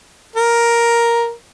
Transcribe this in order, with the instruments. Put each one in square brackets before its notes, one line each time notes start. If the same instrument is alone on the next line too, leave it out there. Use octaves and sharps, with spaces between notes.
[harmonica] A#4